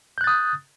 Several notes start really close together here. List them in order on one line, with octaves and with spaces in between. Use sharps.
G6 F#6 A6 D#6